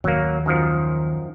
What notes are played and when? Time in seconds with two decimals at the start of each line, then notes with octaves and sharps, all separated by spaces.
0.04 D#2 F#3 A#3
0.46 F#2 D#3 F3